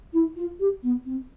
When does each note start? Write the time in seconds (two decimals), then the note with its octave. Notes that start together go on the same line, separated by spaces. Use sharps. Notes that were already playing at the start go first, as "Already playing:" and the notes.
0.13 E4
0.36 F4
0.59 G4
0.83 B3
1.05 C4